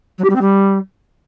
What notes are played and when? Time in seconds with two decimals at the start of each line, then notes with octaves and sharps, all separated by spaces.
0.18 F#3
0.24 G4
0.30 G3
0.35 C4
0.41 G3